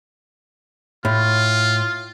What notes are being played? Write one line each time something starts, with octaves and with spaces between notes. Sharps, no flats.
A2 F4